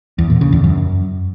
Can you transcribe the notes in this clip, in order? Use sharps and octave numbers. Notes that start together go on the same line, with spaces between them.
E2
A#2
C#3
E2
F#2